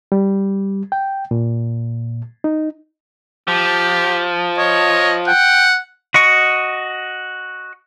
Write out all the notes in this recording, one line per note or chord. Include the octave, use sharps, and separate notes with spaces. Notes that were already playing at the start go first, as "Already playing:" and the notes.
G3
G5
A#2
D#4
F3 G4
C#5 D#5
F#5 G5
F#4 D#5 C#6